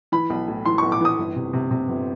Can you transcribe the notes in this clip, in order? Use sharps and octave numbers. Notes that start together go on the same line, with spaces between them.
E3 B5
B1
A2
E3 C6
B1 C#6
D6
E3 D#6
G1
C3
C3
C3
G1